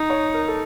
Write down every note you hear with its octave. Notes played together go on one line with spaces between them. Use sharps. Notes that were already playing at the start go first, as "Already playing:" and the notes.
Already playing: D#4
C#5
A#4
A4